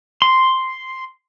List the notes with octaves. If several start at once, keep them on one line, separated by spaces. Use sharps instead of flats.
C6